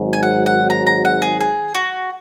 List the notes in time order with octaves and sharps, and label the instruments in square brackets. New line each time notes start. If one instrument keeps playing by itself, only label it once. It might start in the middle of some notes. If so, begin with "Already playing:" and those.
Already playing: [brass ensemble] G#1 G#2 F#3
[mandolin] G#5
F#5
F#5
A#5
A#5
F#5
G#4
G#4
F#4